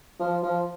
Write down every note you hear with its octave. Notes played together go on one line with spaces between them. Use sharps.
F3
F3